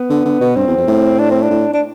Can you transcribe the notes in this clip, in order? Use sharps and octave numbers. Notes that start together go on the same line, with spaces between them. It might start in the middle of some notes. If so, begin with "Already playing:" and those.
Already playing: B3
D3
D3
B2
G2 C4
E2
F2
A2
D4
C4
D4
A2
D4